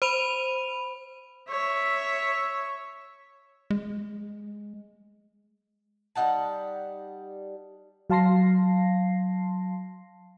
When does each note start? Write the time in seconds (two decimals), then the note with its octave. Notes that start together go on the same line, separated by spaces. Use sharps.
0.02 C5 B5 D#7 F7
1.50 C#5 E5
3.70 G#3
6.15 G3 D#4 F#5 A5
8.10 F#3 F5 A5 C6 A#6 C7